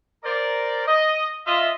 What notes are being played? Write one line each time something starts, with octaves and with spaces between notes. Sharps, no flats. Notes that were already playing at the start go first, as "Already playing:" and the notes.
A#4 C5 D5
D#5
F4 D#5 E5